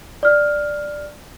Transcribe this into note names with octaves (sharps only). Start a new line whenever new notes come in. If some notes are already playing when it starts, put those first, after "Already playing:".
D5 F6